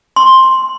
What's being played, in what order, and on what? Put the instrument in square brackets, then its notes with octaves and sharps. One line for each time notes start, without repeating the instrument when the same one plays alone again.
[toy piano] C6